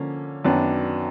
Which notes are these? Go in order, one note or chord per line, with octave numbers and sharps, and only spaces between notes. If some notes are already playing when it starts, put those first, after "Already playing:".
Already playing: D3 F3 A#3 C#4
F#2 D#3 F#3 B3 D4